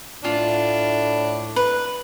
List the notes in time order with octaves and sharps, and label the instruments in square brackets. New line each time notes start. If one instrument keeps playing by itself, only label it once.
[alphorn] A2 [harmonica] D4 [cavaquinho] F4
[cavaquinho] B4